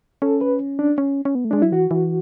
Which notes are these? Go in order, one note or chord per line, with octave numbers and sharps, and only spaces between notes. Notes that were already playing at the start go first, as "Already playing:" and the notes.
C#4 A4
B4
D4
C#4
C#4
B3
A3
G#3 D4
F#3 E4
E3 F#4
E3